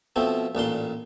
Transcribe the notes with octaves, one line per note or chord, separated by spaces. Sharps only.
B2 F3 A3 C4
A1 A#2 D4 C6